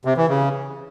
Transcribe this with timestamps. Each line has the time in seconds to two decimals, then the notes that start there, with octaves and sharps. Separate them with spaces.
0.05 C3
0.17 E3
0.29 C#3